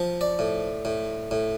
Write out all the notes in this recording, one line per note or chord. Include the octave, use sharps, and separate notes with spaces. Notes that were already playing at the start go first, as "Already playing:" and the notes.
Already playing: F3
D5
A2
A2
A2